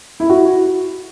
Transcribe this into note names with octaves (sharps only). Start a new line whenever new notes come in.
E4
F#4